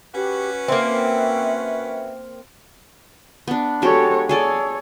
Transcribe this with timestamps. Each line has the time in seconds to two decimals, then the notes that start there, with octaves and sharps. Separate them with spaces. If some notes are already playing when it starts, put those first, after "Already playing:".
0.15 C#4 F#4 G4 B4
0.68 A#3 C4 E5
3.48 B3 D4
3.82 G#3 F#4 G4 A4 C#5
4.29 G#4 A4 C#5 D5